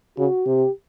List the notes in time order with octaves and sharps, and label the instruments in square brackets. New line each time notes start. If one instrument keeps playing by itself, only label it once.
[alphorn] C#3 [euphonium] F#4
[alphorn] C3 [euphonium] G4